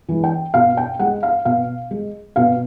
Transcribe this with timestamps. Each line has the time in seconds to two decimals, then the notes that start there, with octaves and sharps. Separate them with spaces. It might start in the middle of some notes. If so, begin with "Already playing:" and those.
0.09 E3 G#3
0.24 G5
0.54 B2 F5
0.77 G5
0.99 G#3 F#5
1.23 F5
1.45 B2 F5
1.91 G#3
2.36 B2 F5